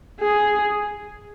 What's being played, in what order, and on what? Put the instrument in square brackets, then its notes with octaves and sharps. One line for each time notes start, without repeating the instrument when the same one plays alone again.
[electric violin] G#4